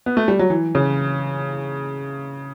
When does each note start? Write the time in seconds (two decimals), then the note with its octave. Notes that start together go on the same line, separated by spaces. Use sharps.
0.06 B3
0.17 A3
0.28 G3
0.39 F#3
0.50 E3
0.75 C#3